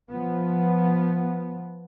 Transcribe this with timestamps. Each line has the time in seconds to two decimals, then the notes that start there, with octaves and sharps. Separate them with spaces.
0.10 F3 B3